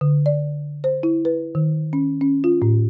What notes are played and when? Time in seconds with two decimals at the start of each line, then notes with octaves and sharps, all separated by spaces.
0.01 D3
0.26 D5
0.84 C5
1.03 E4
1.25 B4
1.55 D#3
1.93 C#4
2.21 C#4
2.44 F4
2.62 A2